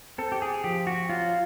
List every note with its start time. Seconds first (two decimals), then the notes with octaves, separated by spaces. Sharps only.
0.18 C4 A4
0.32 G4
0.42 G#4
0.64 F3 G4
0.87 F#4
1.09 F#3 F4